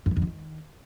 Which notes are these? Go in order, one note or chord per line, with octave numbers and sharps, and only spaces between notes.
F#2
E3
F2
D3
D#3